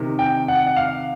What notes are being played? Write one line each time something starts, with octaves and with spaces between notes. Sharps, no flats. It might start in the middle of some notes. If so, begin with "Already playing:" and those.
Already playing: C3 D#3
G5
F#5
F#5
F5